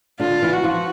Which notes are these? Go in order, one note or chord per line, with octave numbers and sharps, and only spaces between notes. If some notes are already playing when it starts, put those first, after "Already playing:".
D3 D4 F4
E3 E4
F#4
F3 F4